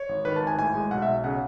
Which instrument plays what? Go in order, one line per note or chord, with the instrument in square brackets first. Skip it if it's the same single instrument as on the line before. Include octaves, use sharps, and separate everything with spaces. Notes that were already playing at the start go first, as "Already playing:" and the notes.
Already playing: [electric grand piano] C#5
G#1
D#3 B4
A5
G#1
G#5
A2 G#5
G#3
B1 F#5
E5
B1
C#3 F#5